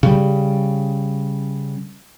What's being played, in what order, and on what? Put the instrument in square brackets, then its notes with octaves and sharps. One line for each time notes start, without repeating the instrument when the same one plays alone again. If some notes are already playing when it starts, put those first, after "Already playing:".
[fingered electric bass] C#3 G3